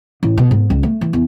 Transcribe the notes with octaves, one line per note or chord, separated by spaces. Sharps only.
A1
B2
G#2
C#2
A3
E3
E2